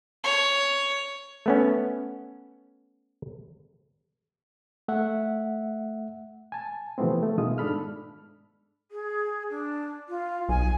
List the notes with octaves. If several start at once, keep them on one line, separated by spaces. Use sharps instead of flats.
C#5
A3 B3 C#4
A3 E5 F#5
G#5 A5
C3 E3 F3 A3 B3 C4
A3
B2 D#3 G#3 F4 D#6
G#2 D4 A4 B5 F6
G#4
D4
F4
B1 G#5